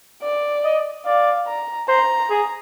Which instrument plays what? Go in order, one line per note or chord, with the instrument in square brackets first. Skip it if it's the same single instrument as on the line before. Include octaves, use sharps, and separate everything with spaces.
[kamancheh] D5
[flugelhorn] D#5
[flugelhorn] D5 [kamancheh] F5
[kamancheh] A#5
[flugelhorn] C5 [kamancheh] A#5
[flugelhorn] G#4